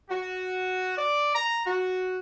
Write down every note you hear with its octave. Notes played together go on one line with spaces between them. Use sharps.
F#4
D5
A#5
F#4